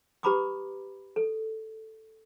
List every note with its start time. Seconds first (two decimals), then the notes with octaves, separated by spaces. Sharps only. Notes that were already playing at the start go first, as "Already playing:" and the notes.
0.23 G4 B4 A#5 B5 D6 D#6
1.16 A4